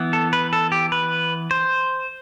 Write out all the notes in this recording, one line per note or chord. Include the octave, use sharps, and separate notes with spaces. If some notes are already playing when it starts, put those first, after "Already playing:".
Already playing: E3 B3
A4
B4
A4
G4
B4
C5